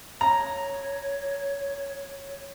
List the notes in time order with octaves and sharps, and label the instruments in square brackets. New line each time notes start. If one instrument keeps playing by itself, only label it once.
[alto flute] C#5 [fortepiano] A#5